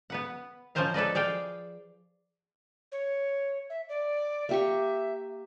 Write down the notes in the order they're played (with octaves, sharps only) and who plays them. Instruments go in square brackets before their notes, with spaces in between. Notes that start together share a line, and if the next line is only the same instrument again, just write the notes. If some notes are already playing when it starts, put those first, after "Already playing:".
[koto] B3 B4 F#5
F3 C#4 A#4 C5 D#5 F5
A4 B4 D5 D#5
G#4 D5 F5 G5
[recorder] C#5
E5
D5
[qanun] A#3 G4 C#6 [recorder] E5